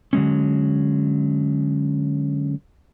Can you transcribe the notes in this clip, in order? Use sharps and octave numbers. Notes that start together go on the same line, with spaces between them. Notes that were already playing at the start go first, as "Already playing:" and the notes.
D3 F#3 G#3 C#4